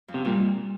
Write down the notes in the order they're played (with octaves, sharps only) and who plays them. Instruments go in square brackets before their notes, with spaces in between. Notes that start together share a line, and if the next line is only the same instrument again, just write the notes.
[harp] F2
[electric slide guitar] C3
[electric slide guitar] A#2 [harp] G3